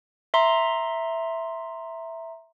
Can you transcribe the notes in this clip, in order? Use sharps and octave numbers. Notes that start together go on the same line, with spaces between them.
E5 A#5 C6